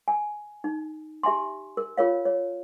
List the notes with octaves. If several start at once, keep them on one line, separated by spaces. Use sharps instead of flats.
G#5
D#4
G4 E5 G#5 C6
A#4
F4 A#4 C#5 F5
C#5